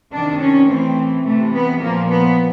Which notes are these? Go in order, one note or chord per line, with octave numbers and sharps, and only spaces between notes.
C3 D#3 D4
C#4
A2 E3 C4
C3 E3 A3
B3
A#2 F3 A#3
B3